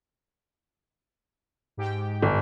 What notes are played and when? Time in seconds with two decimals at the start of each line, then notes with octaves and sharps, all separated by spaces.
1.77 G#2 G4 G5
2.23 G1